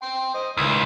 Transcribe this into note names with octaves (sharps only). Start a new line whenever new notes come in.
G5 C6
C5 D#5
C#2 D#3 E3